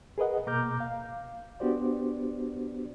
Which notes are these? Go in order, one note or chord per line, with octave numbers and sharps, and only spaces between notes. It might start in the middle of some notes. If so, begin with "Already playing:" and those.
G#4 A#4 B4 D#5 F#5
B2 A#3 A#5 D6 F6 G6
F5
B3 D4 F#4 G4 C5 D5